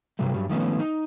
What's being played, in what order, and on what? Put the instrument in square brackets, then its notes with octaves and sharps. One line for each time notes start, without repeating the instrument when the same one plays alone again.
[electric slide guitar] G2 C3 F#3 G3 A3
G2 F#3 G3
D#3 F3 A3 B3 C#4
D#4